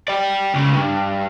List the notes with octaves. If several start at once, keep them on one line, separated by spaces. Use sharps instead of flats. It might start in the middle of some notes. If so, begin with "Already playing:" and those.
D5 G5
C#2 C#3
G2